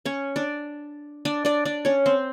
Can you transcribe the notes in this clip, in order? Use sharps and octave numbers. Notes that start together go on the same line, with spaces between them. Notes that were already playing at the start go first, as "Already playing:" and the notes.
C#4 C#5
D4 D5
D4 D5
D4 D5
D4 D5
C#4 C#5
C4 C5